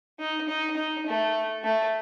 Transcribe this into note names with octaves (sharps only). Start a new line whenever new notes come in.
D#4
D#4
D#4
A3
A3